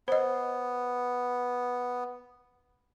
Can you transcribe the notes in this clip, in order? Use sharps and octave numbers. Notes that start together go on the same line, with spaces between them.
B3 C5 D#5